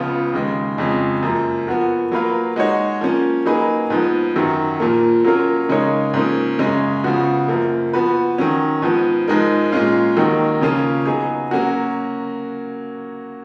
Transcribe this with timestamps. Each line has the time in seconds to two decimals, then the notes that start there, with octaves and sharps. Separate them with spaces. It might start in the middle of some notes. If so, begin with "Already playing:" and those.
Already playing: C#2 C#3 F3 B3 F4
0.33 D#2 C#3 G#3
0.78 F2 C#3 G#3 C#4
1.22 F#2 F3 A#3
1.67 F3 B3 F#4 A#4
2.12 F#3 A#3 F4 B4 F5
2.56 G#3 D#4 F#4 C#5
3.01 F3 A#3 C#4
3.45 F#3 A#3 D#4 G#4 B4
3.90 G#2 F3 B3
4.36 F#2 D#3 F#3
4.80 A#2 F3 A#3
5.24 F#3 A#3 C#4 F4 A#4
5.69 C#3 G#3 D#4 A#4 C#5
6.14 G#2 F3 A#3 C#4
6.59 F#2 C#3 G#3 C#4
7.04 C#3 F3 B3 F#4
7.48 F#2 F3 A#3
7.93 F3 B3 F#4 B4
8.38 D#3 F#3 C#4
8.82 G#2 F3 B3
9.28 G#2 F3 G#3 D#4 A#4
9.72 A#2 G#3 C#4 F4
10.16 D#2 D#3 F#3 A#3 D#4
10.61 C#3 F3 A#3 C#4 F4
11.05 F#3 B3 D#4 G#4
11.51 F#3 A#3 C#4 F#4 A#4